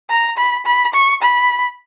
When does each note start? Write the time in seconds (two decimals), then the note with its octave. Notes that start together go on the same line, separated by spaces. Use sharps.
0.10 A#5
0.37 B5
0.66 B5
0.94 C#6
1.23 B5